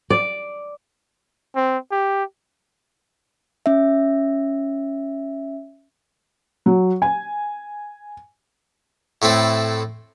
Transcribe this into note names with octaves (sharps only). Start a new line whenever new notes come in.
D5
C4
G4
C#4 E5
F#3
G#5
A2 A3 C4 E4